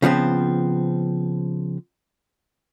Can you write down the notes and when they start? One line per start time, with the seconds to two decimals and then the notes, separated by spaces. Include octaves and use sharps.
0.02 C#3 F3 B3 C4